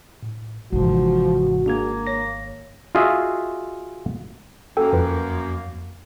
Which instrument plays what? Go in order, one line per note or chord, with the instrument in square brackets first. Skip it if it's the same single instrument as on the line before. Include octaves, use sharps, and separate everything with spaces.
[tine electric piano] A2
[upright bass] G#1 [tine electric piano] G#2 C3 E3 [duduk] F3 [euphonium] F#4
[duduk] A#3 [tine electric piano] D4 G#4 G#6
[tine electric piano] C#5 A#6
[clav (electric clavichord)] F4 F#4 G#4 D#5 E5
[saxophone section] F#2 A#3 [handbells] A4 G5
[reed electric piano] F2 [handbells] F4 B4